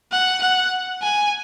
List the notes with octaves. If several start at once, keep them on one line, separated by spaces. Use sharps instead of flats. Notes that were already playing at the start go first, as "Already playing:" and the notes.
F#5
F#5
G#5